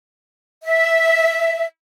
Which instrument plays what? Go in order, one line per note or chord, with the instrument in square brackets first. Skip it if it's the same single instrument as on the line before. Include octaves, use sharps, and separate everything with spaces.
[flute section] E5